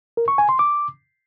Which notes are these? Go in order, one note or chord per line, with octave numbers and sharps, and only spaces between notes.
A#4
C#6
G#5
C6
D6